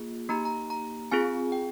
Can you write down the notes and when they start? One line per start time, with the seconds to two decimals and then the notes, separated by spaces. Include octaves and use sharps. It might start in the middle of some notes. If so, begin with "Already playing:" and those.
Already playing: A#3 F4 G#4
0.29 A#3 D#4 G4 A#5
0.45 A#5
0.70 A#5
1.11 C4 F4 G#4 G#5
1.52 G5